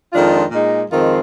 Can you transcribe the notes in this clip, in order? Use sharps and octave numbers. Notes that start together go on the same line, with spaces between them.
F2 D#3 G#3 D4 F4
A#2 G#3 D#4
F2 D#3 G#3 C4 F4